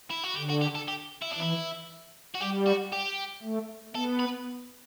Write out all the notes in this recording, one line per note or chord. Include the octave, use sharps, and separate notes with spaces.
E4
F#4
D3 G4
F#4
G4
A4
G4
E4
D4
E3 E4
F#4
G3 G4
F#4
G4
A3
B3 A4
B4